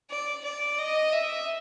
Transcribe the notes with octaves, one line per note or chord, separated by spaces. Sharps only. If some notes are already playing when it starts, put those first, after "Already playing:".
D5
D5
D#5
E5